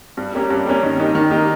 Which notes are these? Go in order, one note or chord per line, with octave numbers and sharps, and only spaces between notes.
G2
G3 A#3 C#4 G4
G2
G3 A#3 C#4 G4
D#3
A#3 D#4 G4
D#3
A#3 D#4 G4